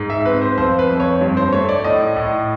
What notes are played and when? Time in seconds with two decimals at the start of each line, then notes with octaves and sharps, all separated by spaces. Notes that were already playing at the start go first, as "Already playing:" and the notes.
Already playing: G#2
0.10 E5
0.25 C4 B4
0.42 C5
0.57 F2 C5
0.79 B4
0.90 F2
1.00 C#5
1.21 G2
1.37 C5
1.52 A3 C#5
1.69 D5
1.84 A2 D#5
2.16 A2